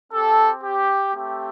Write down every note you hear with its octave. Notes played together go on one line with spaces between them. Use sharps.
C4 G4 A4
G4
A3 C4 G4